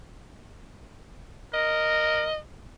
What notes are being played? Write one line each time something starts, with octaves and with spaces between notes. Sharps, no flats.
A#4 D#5